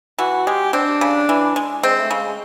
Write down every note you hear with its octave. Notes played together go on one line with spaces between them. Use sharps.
E3 F#4
G#3 G4
C4 D4
C#3
E3
G#3
G#3 C4
A3
C#3 G#3